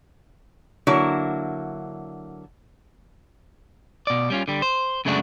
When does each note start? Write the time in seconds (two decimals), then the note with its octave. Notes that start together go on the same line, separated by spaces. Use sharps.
0.87 D3 F#3 A#3 E4
4.07 B2 D5
4.30 G3 C#4 F4
4.48 D3 G3
4.62 C5
5.05 F#2 C#3 G#3 A3 D4 F#4